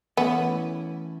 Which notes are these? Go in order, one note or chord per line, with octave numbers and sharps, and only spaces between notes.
E3 A3 B3 C#4 E4